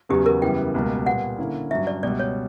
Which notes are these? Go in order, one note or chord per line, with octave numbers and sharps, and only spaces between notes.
E2 C#3 F#3 B3 G4
A#4
F#2 C#3 E3 G3 B3 G5
C#2 B2 G3 A#3
A#2 G3 B3 F#5
D3 A#3 C#4 E4
G2 F#3 C#4 E5
D5
C#2 B2 G3 D5
C#5